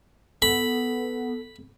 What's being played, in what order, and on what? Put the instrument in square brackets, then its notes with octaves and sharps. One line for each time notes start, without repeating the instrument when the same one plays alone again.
[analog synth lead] B3 [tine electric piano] A4 [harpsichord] B5